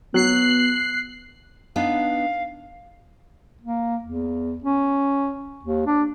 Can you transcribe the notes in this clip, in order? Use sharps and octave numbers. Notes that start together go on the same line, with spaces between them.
F#3 B3 F#6 C7
B3 D4 D#4 F5
A#3
E2
C#4
D#2
D4